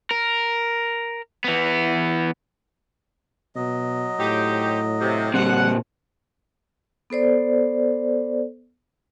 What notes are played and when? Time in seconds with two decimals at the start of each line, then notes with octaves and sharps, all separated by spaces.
0.11 A#4
1.44 E3 B3
3.56 B2 F#3 D#5
4.19 A2 C4 D#4 G4
4.99 C3
5.34 A#2 G3 C4 F#5
7.10 B3 A4 C5 D5